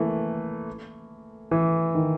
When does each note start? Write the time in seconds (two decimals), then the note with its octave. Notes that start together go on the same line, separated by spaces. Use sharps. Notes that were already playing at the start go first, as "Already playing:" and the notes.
Already playing: E3 A3 A#3
1.51 E3
1.95 D#3